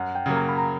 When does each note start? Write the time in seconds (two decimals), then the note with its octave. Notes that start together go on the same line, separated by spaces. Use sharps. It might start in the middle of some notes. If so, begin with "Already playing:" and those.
Already playing: F#2 F#5
0.15 G5
0.26 C#3 F#3 A#3
0.37 A#5
0.49 B5
0.58 A#5